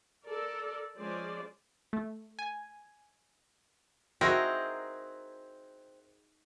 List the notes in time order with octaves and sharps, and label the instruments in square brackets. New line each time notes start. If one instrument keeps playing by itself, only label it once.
[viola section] A4 A#4 D5
F3 G#3 C#4 G#4 C5 D5
[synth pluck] A3
G#5
[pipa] C4 [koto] D#4 G#4 A#4 [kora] E4 F#4 [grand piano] A#6